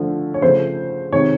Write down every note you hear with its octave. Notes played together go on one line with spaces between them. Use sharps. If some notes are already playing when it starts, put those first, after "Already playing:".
Already playing: D3 F3 A3
C#5
C#3 F3 A3 C5
C3 D#3 G#3 C#5